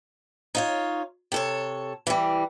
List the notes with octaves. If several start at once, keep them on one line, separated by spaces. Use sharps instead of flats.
D#4 F4 C#5
C3 A4 C#5
E3 G3